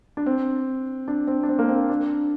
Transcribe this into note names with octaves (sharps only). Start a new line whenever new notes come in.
D4
C4
D4
C4
D4
C4
A#3
C4
D4